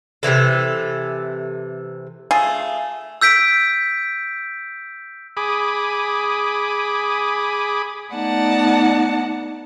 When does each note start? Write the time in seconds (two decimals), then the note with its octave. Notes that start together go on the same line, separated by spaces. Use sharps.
0.23 C3 D#3 E3 A4
2.31 A3 F4 G#4
3.21 E6 G6 B6 D7
5.37 G#4 B5 D6 D#6
8.12 A3 B3 D#4 D5 F#5 A5